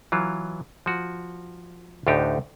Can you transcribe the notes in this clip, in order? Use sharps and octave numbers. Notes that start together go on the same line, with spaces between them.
E3 F#3 F4
F3 F#4
D2 A2 D3 D4 D#4 G4